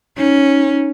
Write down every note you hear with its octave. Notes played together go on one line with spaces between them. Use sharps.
C#4 D#4